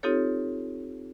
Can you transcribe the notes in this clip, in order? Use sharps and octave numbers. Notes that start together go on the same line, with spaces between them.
C4 D#4 F4 G4 A4 C#5